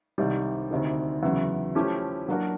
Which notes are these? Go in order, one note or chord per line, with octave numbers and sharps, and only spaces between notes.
C2 C3 D#3 G3
D2 C3 D#3
E2 C#3 F#3
F3 A3 C#4 E4 G4
F#3 A#3 D4 F#4 A#4